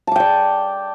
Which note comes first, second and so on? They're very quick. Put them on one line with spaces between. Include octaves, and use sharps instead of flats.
A5 D6 G5 D5